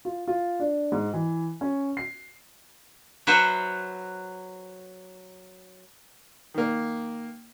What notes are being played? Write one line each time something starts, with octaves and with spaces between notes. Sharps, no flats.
F4
F4
D4
G#2
E3
C#4
C7
F#3 B4 C5 E5 F#5
D#3 A#3